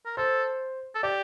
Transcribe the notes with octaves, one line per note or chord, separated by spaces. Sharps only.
A#4
A4 C5
A4
G4 D5